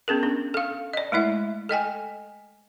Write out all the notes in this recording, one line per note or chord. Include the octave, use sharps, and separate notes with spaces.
B3 C#4 G#4 A#4
D4
A4 F5
D5 D#5
G#3 A3 E4 E5
A4 D#5 G5 G#5